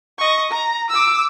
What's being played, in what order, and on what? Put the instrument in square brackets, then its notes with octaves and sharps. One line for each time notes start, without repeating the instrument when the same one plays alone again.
[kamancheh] D#5 C#6
A#5
D6 E6